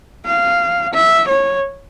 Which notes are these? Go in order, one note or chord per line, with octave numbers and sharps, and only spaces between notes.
F5
E5
C#5